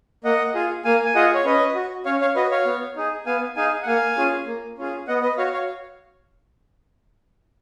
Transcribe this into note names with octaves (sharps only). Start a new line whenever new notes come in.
A#3 D#5 F#5
F4 G#4
A#3 F5 G#5
G#5
F4 G#4 D#5 F#5
C#5
C#4 B4 D#5
F#4
C#4 C#5 F5
C#5 F5
F#4 B4 D#5
C#5 F5
B3
D#4 G#4
B3 F5 G#5
D#4 G#4 F5 G#5
F#5
A#3 F5 G#5
C#4 F4 G#4
A#3
C#4 F4 G#4
B3 D#5 F#5
B4 D#5
F#4 C#5 F5
C#5 F5